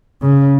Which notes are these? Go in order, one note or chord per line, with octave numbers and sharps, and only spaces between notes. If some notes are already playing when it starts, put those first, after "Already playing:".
C#3